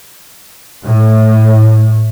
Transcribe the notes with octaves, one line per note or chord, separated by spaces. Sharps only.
A2